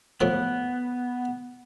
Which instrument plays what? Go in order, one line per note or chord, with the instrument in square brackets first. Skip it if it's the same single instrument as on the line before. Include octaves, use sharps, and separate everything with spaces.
[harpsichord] A2 F3 D#6 [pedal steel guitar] B3